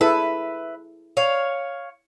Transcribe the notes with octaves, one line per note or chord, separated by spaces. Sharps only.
E4 G#4 A4 B4 E5
C#5 F5